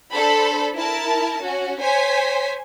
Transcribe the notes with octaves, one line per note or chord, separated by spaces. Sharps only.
D4 A4 C5 B5
E4 A#4 A5
C#4 F#4
C5 C#5 G#5 B6